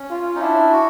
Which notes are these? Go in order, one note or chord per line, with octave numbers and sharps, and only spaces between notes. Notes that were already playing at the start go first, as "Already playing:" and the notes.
Already playing: C#4
F4
D#4
D4 E4
F#4